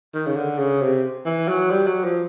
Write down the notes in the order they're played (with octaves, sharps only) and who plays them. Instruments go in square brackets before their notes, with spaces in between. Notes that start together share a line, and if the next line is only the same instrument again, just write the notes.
[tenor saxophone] D#3
C#3
D3
C#3
C3
E3
F#3
G3
F#3
F3